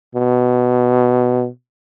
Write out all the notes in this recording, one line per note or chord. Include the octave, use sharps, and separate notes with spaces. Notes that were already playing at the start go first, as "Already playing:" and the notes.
B2